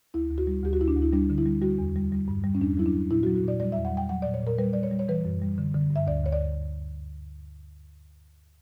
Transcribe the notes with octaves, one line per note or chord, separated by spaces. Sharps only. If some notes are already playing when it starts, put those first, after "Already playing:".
D2 E4
D2
F#4
G3
D2 G4
F#4
D2 E4
D4
D2
E4
G3 D4
D3
E4
G3
G3 F#4
E2
G3
G3
G2
G3
C#4
E2 D4
F#3 E4
D4
F#3
A#2 E4
F#3 F#4
F#4
A#2 D5
G3 D5
E2 E5
F#5
G3 G5
F#3 F#5
A#2 D5
C#5
A#2 A#4
G3 B4
G3 D5
C#5
G3
C#5
E3 B4
F#2
G3
D3
D3
G2
E5
D2 D5
D2 C#5
D5